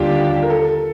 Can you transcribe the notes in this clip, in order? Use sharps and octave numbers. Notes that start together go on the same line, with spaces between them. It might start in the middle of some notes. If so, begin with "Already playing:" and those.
Already playing: D#2 D3 G3 D4 F4 G4
A#4
A4